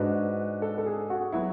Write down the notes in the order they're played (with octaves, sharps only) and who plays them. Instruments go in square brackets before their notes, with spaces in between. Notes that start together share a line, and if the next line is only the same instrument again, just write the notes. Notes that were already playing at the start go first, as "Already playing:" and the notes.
Already playing: [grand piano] G#2 G#3 D4 F#4 [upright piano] B4
[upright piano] A4
A4
G#4
F#4
[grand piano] F#3 B3 F#4 [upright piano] E4